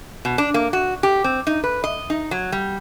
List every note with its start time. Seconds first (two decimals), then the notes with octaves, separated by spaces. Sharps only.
0.25 B2
0.38 D4
0.54 A#3
0.73 F#4
1.03 G4
1.24 C4
1.47 D#4
1.64 B4
1.84 D#5
2.10 D#4
2.31 F#3
2.52 G3